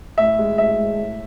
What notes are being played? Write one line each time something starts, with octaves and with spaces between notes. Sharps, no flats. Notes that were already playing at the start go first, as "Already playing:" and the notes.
A2 E5
G#3
A2 E5
G#3
A2